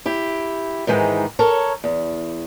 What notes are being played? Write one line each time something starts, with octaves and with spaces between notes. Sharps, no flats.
E4 G4
G#2 D#3 E3 G#3
A4 A#4 C#5
E2